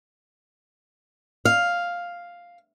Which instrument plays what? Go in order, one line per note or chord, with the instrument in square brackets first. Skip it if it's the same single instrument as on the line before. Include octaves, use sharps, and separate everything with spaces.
[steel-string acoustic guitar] F5